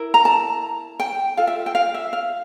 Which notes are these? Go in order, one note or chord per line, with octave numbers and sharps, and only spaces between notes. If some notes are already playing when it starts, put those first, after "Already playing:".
Already playing: E4 A#4
A#5
A5
G5
F4 A4 F5
E5
G5
F5
E5
F5